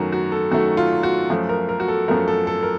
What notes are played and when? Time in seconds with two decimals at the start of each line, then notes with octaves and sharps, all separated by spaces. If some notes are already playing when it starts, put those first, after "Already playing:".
Already playing: F#2 D#3 F#3 A3 F#4 A#4
0.12 F#4
0.32 A4
0.52 F#2 D#3 F#3 A3 F#4
0.77 F4
1.03 F#4
1.30 F#2 F3 A3
1.49 A#4
1.69 A#4
1.80 F#4
1.88 A4
2.08 F#2 F3 A3 A#4
2.28 A4
2.47 A4
2.63 A#4